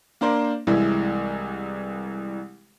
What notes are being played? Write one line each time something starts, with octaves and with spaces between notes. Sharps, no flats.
A#3 D4 A#4 C5
C2 E3 G#3 E4